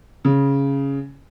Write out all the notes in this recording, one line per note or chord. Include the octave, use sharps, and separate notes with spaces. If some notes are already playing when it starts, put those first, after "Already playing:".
C#3